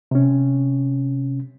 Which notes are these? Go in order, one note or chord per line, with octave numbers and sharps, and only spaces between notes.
C3 C#4